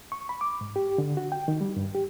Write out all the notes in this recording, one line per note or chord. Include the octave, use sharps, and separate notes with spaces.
C#6
B5
D6
G#2
G4
D3
F#4
G5
D#3
G3
G2
G4